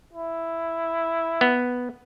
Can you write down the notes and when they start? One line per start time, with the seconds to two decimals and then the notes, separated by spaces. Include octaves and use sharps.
0.13 E4
1.41 B3